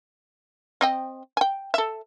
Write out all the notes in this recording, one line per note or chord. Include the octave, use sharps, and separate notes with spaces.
C4 D#5 G5
G5 G#5
A4 E5